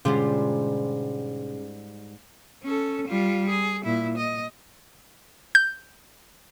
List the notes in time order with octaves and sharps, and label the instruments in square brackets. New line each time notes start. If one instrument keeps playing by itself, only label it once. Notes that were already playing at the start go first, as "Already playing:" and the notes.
[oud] G#2 G3 F4 [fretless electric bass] B2 D3 G#3 [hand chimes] C#4 G#4
[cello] C#4 A4
G3 F4
G#4
A#2 E4
D#5
[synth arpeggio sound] G6